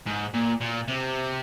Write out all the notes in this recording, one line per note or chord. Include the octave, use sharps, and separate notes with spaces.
G#2
A#2
A#2
C3